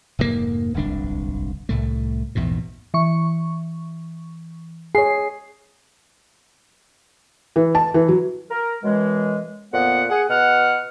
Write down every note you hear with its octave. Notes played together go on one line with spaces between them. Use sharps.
F1 G#2 B2 A#3
D1 G1 C2 D4
C2 A2 A3
A#1 E2 G#2 B2
E3 C#6
G#4 C#5 C7
E3
A5
E3
F#3
A#4
F#2 B2 E3 G#3
F2 A#2 B3 F#5
G#4 F#5
B2 F#5 F6